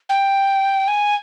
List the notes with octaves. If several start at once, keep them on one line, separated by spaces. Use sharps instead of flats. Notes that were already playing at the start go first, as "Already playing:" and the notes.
G5
G#5